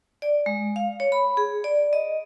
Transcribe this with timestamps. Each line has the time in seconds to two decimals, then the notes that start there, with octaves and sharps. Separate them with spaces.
0.22 D5
0.46 G#3
0.76 F5
1.00 C#5
1.12 B5
1.37 G#4
1.64 D5
1.93 D#5